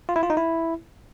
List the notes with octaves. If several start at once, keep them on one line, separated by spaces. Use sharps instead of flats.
F4
E4
F4
D#4
E4